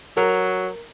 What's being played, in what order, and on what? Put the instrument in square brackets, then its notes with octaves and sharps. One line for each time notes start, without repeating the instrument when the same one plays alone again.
[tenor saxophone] F#3 [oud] A#4